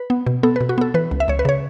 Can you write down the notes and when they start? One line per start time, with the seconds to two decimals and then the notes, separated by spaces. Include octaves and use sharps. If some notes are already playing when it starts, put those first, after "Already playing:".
Already playing: B4
0.10 B3
0.27 B2
0.43 B3 A4
0.56 B2 B4
0.69 F#4
0.78 B3 A4
0.94 E3 B4
1.11 C#2
1.20 E5
1.28 C#2 C#5
1.39 B4
1.45 C#3 C#5